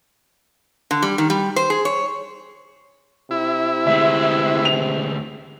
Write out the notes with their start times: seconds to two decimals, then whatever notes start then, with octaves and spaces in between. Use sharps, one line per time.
0.91 D3
1.03 G3
1.18 D#3
1.30 G3
1.56 C5
1.70 G#4
1.85 C#5
3.31 C3 E4
3.87 D2 G#3 E5
4.65 F7